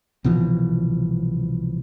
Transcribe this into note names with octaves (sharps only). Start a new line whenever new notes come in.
C2 B2 E3 F3